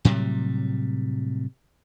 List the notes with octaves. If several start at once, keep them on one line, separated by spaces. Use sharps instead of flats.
A2 C3 F#3 G3